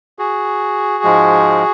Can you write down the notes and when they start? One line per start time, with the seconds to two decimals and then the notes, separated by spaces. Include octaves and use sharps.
0.19 F#4 G#4
1.04 G#2 F3 G#3